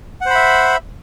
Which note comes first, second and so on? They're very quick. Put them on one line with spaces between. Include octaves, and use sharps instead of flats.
F#5 C5 B5 E5